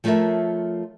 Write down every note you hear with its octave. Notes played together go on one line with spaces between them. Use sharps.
F3 A3 F4 A#4 C#5 E5